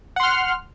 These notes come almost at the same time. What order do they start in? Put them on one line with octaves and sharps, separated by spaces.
F#5 C6 F6